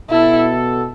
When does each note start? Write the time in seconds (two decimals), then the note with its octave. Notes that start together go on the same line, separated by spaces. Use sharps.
0.10 B2 B3 E4 F#4 A4